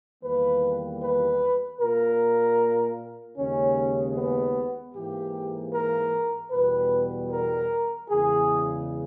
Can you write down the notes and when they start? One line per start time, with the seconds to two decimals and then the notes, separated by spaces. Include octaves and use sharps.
0.22 E2 D#3 G3 A#3 B4
1.01 B4
1.79 A#2 A#3 A#4
3.37 D#2 C#3 G#3 C#4
4.15 B3
4.94 G#2 E3 A#3 G4
5.73 A#4
6.51 E2 B2 G3 B4
7.31 A#4
8.09 E2 C#3 G#3 G#4